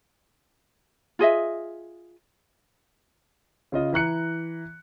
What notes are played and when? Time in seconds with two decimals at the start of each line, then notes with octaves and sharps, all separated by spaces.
1.19 F4 G#4 D#5 E5
3.72 C#3 F4 D#5
3.93 E3 A#5 F#6 C#7